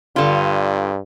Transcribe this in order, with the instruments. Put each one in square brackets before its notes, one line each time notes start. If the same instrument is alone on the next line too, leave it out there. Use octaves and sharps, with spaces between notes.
[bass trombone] G2 [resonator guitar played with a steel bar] D3 F4